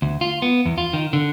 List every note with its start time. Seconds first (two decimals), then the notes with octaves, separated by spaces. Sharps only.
0.02 D2
0.21 F4
0.42 B3
0.65 E2
0.78 F4
0.93 D#3
1.13 D3